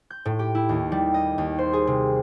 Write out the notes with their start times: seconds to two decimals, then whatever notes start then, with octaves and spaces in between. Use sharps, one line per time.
0.10 G6
0.25 A2
0.39 G4
0.55 E4
0.69 D#2
0.92 G3
1.14 D#5
1.38 D#2
1.58 C5
1.73 G#4
1.87 C3